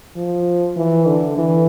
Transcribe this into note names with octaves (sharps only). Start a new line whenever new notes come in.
F3
E3
D3
E3